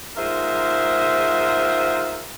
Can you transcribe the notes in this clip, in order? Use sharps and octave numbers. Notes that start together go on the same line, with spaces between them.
G#2 F4 A#4 C5 E5